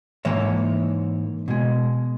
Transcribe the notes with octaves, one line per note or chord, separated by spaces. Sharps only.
G#2 E3 A#3 C#5 E5
B2 G#3